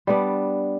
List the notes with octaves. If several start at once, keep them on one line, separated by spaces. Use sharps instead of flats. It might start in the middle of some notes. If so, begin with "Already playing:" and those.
G3 B3 D4